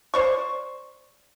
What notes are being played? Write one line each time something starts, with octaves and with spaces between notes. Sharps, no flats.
C5 D5 C#6